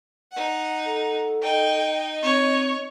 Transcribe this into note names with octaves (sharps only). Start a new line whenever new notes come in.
D#4 F#5
A4
D#4 D#5 G5
C4 C#5